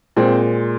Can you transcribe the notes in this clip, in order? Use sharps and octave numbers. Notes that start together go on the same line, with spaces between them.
A#2 G#3 C4